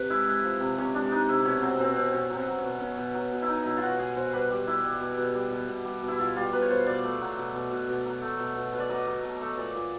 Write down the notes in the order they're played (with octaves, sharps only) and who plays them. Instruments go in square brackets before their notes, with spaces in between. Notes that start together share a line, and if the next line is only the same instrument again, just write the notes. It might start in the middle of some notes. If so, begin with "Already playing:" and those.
Already playing: [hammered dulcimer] C3 B4
G#3 E4
G#3
F3
C3
C3 C#4
G#3 D4
G#3 D#4
C3 E4
B2 C#4
F#3 C4
B2 C4
B2 C4
B2 C#4
F#3
C4
F#3
C#4
B2
B2 C#4
B2
F#3
B2
E4
F#3 D#4
B2 E4
F4
B2 F#4
B2 G#4
B2 C5
G3 B4
G3
G3 E4
G3
B2
B2
G3
B2
B2
G3
B2
E4
B2 F4
G3 F4
B2 B4
C#5
B2 C5
B2 D5
A3
F#3
B2
B2
B2
B2
F#3
A3
B2
B2
B2
D5
F#3 D#5
F#3
B2
A3
A#2 D5
A#2